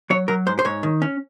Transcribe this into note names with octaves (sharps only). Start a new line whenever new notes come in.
F#3 C#5
F#3 A#4
G#2 C5
C5
G#2 C#5
D#3
C#4